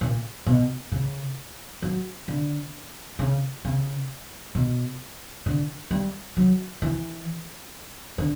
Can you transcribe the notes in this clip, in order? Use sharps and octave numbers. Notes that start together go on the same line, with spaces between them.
A#2
B2
C#3
F#3
D3
C#3
C#3
B2
D3
G3
F#3
E3
D3